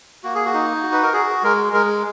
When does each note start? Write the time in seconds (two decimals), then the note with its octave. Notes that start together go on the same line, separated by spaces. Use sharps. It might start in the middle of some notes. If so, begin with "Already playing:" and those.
0.24 A#3 F#4
0.35 G#4
0.45 F#4
0.54 D#4
0.83 F#4
0.92 B4
1.03 A#4
1.13 F#4 G#4
1.43 G#3 A#4
1.73 G#3 A#4